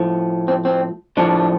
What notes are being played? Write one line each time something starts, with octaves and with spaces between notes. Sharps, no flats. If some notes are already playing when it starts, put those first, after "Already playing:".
Already playing: A2 F3
C4
C4
A2 F3 D4